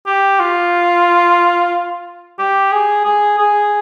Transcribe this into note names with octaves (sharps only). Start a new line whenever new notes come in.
G4
F4
G4
G#4
G#4
G#4